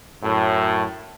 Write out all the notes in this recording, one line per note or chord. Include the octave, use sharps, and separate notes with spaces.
F#2 A2